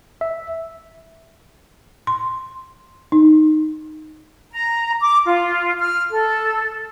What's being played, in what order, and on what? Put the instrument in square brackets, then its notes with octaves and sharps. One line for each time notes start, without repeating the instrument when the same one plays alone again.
[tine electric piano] E5
[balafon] C6
D#4
[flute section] A#5
D6
F4
F6
A4